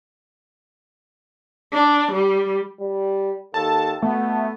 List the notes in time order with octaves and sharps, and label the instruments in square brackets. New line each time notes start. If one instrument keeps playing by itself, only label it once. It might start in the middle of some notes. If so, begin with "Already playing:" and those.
[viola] D4
G3
[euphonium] G3
[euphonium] D#2 [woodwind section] A4 [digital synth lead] A5
[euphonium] B2 [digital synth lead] A3 [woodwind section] B3